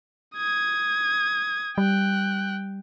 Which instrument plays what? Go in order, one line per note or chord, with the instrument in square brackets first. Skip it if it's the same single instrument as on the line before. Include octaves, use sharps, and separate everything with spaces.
[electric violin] D#6 G#6
[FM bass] G3 [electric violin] G5 F#6